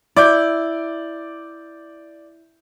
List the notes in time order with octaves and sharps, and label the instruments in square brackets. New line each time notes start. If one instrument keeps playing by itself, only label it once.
[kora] E4 [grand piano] D5 D6 G6